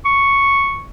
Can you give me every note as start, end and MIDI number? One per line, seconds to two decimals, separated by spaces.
0.05 0.85 85